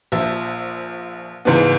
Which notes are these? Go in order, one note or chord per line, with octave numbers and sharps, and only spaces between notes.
A#1 F3 E5
C#2 G#2 E3 B3